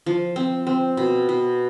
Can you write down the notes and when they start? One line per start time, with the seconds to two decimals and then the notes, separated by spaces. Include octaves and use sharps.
0.06 F3
0.36 C4
0.67 C4
0.97 B2
1.29 B2